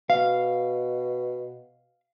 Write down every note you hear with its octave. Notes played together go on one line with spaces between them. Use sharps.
B2 F5